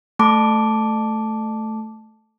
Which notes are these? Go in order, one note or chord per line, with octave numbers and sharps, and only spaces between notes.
A3 A5 D6